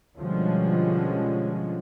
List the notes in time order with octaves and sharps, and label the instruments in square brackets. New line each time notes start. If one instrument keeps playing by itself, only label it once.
[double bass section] B2 D3 F3 G3 G#3 C#4